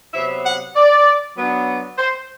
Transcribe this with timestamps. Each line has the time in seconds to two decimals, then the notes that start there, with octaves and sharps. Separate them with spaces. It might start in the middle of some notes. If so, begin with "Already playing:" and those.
0.14 C3 F#3 B3 E5
0.45 F#5
0.76 D5
1.37 F#3 B3 D4
1.98 C5